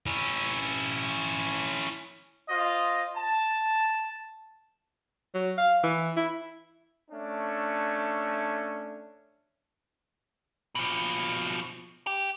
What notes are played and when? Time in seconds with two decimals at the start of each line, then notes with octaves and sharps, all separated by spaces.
0.07 C#4 E4
2.49 F4 C5 D#5
3.15 A5
5.35 F#3
5.58 F5
5.83 E3
6.17 E4
7.10 A3 C#4 D4
10.75 B2 F3
12.07 G4